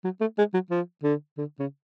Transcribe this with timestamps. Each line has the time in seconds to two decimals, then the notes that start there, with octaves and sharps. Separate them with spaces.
0.04 F#3
0.21 A3
0.38 G#3
0.54 F#3
0.70 F3
1.04 D3
1.38 D3
1.59 C#3